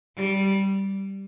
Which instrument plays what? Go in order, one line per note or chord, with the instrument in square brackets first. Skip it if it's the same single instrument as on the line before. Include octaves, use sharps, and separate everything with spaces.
[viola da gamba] G3